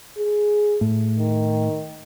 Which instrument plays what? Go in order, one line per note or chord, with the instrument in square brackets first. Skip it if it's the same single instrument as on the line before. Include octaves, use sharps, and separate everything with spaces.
[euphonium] G#4
[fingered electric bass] A2
[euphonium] D#3